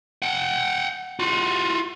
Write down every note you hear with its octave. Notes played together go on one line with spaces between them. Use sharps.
F#5 G5
F4 F#4